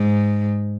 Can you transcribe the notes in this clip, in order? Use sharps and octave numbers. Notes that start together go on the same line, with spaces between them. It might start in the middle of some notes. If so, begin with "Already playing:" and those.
Already playing: G#2